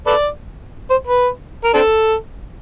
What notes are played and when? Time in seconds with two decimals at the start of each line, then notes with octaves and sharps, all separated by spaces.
0.07 A4 B4 D5
0.90 C5
1.07 B4
1.65 A#4
1.74 C4 D4 A4